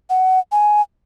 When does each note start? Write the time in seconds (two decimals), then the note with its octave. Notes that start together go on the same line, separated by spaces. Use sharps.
0.10 F#5
0.52 G#5